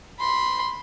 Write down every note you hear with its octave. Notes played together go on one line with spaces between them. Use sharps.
B5 C6